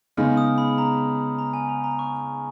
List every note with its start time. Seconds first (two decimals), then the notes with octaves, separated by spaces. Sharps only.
0.17 C#3 G#3 B3 D#4 F6
0.37 D#6
0.58 B5
0.78 A#5
1.38 A#5
1.54 G#5
1.69 A#5
1.84 A#5
1.99 C#6